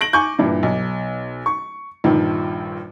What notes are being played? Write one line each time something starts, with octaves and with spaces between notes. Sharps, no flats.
A#6 D7 F#7
G#5 C#6 D6 G6
G2 A#2 E3 D4 E4
B1
C#6
A#1 G2 D#3 F3